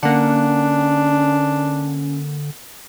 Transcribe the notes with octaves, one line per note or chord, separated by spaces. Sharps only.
D3 A#3 C#4 D4 F#5